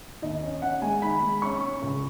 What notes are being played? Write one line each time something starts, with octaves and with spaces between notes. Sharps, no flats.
D#2 D#5
C#4
C#4 F#5
G#3 G#5
D#3 B5
G#3
C#4 C#6
C#4
C#2